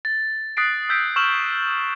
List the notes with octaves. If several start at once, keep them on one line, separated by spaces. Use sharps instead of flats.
A6
D#6 F#6 A6 B6 C7 D7
E6 G6 B6 D7
C#6 E6 F6 E7 F#7